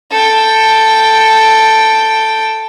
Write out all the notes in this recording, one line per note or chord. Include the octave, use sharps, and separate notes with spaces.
A4 G5